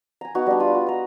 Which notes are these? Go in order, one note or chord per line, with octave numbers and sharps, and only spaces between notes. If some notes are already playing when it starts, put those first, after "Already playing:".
G#5 A#5
B3 D#4 F#4
G3 D4
F4 B5 D#6
F#4
D#5 A#5